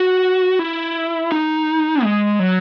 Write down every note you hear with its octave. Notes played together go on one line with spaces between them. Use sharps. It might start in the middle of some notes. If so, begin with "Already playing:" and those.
Already playing: F#4
E4
D#4
G#3
F#3